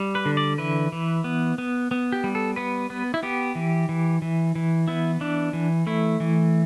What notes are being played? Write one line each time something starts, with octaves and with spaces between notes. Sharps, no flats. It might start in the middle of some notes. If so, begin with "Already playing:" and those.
Already playing: G3
B4
D3
D5
E3 B4
E3
B3
B3
B3
G4
G3
A4
B3 B4
B3
E4
B3 G4
E3
E3
E3
E3
B3 E4
E3 D4
E3
A3 E4
E3